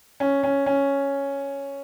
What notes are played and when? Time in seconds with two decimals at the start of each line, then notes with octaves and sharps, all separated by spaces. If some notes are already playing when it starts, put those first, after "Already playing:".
0.20 C#4
0.43 C#4
0.66 C#4